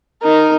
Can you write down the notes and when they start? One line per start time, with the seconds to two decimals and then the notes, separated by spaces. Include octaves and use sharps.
0.23 D#4 A#4